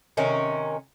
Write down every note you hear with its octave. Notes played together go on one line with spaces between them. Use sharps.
C3 D#3 C#4 A#4